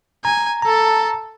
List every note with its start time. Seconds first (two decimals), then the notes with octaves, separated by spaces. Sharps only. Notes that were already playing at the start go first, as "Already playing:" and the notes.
0.25 G#5 A#5
0.62 A4 A5 A#5